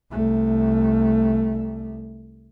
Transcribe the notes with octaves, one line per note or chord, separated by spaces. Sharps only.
C2 A3